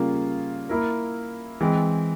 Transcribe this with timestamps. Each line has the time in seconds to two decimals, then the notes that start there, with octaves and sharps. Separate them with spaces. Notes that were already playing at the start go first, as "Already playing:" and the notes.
Already playing: C#3 G3 A#3 F4
0.69 A#3 E4 A#4
1.61 E3 G#3 C4